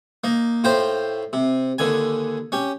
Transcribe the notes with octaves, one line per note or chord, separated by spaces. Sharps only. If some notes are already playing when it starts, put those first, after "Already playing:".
A#3 D#4
A2 F4 C5 G5 C6
C3
D#2 D3 G#5
C#4 G4